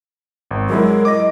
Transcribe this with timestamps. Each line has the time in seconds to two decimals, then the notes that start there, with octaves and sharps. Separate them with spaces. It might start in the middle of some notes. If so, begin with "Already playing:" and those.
0.51 G#1
0.69 F#3 G#3 E4 A#4
1.05 D#5 D6 A#6